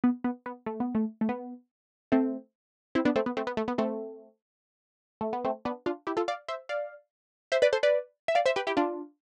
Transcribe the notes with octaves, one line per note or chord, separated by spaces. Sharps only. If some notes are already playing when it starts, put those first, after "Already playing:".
B3
B3
B3
A3
B3
A3
A3
B3
A3 C4
C4 E4
B3 D4
A3 C4
B3
A3 C4
B3
A3
B3
A3 C4
A3
B3
A3 C4
B3 D4
D4 F4
E4 G4
F4 A4
D5 F5
C5 E5
D5 F5
C5 E5
B4 D5
A4 C5
B4 D5
E5
D5 F5
C5 E5
G4 B4
E4 G4
D4 F4